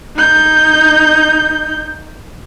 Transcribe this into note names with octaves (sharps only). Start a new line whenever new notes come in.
D#4 G6